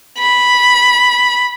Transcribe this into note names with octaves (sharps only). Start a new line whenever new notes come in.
B5